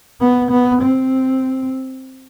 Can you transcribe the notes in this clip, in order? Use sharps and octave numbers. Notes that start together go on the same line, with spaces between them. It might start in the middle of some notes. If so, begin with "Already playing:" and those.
B3
B3
C4